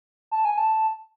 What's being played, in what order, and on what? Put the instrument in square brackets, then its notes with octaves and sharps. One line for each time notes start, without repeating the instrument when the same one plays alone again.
[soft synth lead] A5
G#5
A5